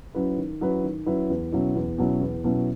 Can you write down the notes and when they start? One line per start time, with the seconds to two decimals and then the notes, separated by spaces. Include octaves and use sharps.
0.15 F#3 C#4 E4 B4
0.37 D#3
0.61 F#3 C#4 E4 B4
0.83 D#3
1.06 F#3 C#4 E4 B4
1.30 E2
1.52 B2 F#3 C#4 E4
1.75 E2
1.98 B2 F#3 C#4 E4
2.21 E2
2.44 B2 F#3 C#4 E4